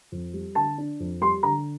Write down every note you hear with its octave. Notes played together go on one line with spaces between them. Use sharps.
F2
G3
D3 A5
D4
F2
G3 C6
D3 A#5